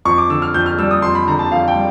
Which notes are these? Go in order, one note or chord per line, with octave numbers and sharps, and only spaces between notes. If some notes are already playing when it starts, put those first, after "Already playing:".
F2 C#6
D6
D3 E6
F6
F2 G6
F6
G3 E6
D#6
F2 C6
B5
D3 A#5
A5
F2 F5
G5
G3